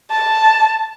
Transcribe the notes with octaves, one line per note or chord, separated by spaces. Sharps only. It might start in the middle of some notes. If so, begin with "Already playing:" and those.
A5